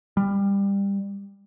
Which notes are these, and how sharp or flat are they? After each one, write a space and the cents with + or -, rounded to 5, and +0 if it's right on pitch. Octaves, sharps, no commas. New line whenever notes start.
G3 +20